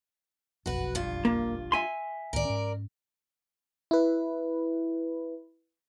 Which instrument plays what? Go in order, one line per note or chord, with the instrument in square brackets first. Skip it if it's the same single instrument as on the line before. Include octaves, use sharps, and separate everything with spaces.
[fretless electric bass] F#1 B1 F2 [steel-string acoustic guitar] F#4 B4
[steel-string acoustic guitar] G2 F4
[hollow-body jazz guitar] A#3
E5 G#5 C6
[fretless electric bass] C#2 A2 D#3 [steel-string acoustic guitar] A#4 D5
[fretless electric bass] G#2 C#4
[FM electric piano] E4 B4